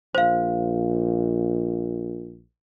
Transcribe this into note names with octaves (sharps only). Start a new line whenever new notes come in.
A#1 C5 F5